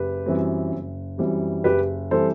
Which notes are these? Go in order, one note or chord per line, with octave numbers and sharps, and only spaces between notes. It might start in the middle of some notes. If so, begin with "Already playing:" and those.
Already playing: F#1 G4 B4
F#2 E3 G3 C4
F#1
F#2 E3 G3 C4
F#1 G4 B4
E3 G3 C4 A4 C5